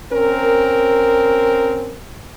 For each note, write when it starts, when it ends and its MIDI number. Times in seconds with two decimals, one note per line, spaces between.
0.12 1.94 60
0.12 1.94 61
0.12 1.94 70